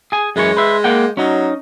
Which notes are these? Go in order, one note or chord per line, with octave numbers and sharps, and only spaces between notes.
G#4 G#5
F#2 E3 G#3 C#5
B4 C5 E5
A#3 F#5 G5
F#3 C#4 D#4